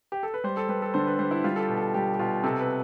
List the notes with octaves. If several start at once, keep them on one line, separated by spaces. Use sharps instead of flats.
G4
A4
B4
G3 C5
A4
G3 B4
A4
D3 C5
B4
G3 C5
E4
G3 F4
A4
G4
B2
A4
G3 G4
G4
B2 F4
C3 A4
B4